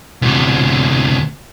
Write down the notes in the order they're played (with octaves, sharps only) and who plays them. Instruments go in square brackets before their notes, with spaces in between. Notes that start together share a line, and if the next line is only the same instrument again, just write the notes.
[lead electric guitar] D2 C3